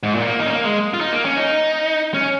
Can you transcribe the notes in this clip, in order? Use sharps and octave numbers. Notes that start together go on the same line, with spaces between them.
G#2
A#2
A#3
D#4
C#4
A#3
G#3
F4
D#4
A#3
C#4
D#4
C#4